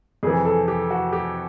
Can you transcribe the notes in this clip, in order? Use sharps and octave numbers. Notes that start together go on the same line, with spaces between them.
F2 C3 E3 G#4
A4
G4
F#4
G4